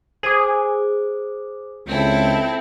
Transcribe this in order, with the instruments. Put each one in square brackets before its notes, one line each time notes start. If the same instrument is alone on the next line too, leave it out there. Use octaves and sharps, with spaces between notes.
[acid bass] G#4 [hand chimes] C5 D6
[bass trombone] C#2 [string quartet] C4 E4 A4